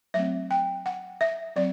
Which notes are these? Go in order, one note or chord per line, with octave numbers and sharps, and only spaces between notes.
F#3 A3 C4 E5
G5
F#5
E5
F#3 C4 D5